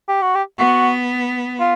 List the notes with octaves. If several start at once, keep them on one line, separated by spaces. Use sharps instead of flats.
G4
F#4
G4
B3 F#4
F4